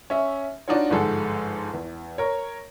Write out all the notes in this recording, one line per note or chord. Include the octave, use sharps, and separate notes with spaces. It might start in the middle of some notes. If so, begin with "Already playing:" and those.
C#4 E5
D4 D#4 F4 F#4 C#5
G1 G#2 F3 G#3 A4 F#5
E2
A#4 C#5